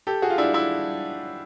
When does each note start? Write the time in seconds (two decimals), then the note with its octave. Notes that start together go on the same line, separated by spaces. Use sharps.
0.07 G4 A4
0.22 F#4 G#4
0.30 F4
0.38 D4 E4
0.54 D4 E4